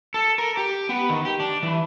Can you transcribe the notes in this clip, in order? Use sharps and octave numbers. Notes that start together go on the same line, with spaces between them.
A4
A#4
G4
B3
D#3
G4
D4
E3